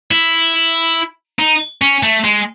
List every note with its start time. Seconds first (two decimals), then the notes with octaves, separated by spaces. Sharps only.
0.11 E4
1.39 D#4
1.82 C#4
2.03 A3
2.24 G#3